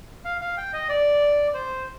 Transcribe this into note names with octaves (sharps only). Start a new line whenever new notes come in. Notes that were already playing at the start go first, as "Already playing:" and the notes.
F5
F5
G5
D#5
D5
C5